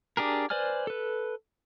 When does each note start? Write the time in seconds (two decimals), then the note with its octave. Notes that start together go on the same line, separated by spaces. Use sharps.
0.17 D4 G4 G#4 A#4
0.50 B4 C5 D5 G#5 F6
0.87 A4 B4